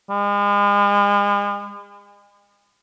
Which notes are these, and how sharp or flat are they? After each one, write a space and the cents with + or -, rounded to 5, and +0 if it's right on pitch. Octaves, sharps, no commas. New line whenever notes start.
G#3 -40